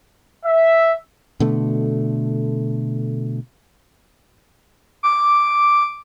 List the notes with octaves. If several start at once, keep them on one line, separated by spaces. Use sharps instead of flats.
E5
B2 D3 A3
D6